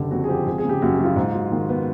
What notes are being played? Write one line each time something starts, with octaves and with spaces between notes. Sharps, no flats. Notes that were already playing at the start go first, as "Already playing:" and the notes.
Already playing: F#1 D3 G4
F2 F#4
G#4
F3 G4
G#1 G#4
G#4
C#3 G4
F#2 F#4
F#4
F#3
F4
G#2
F#3
D#3
B3